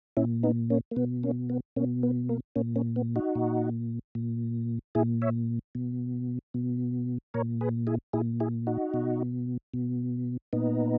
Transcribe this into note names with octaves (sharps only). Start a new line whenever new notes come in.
A#2 C#4 E4
B3 D#4
A#3 C#4
A#3
B2 B3
A#3 C#4
B3
B2 A#3 C#4
B3
A#3
A#2 A#3 C#4
A#3 C#4
B3
D#4 F#4
A#2
A#2
A#2 E4 G#4
C#5 E5
B2
B2
A#2 A#4 C#5
G#4 B4
E4 G#4
A#2 E4 G#4
E4 G#4
D#4 F#4
B2
B2
A#2 B3 D#4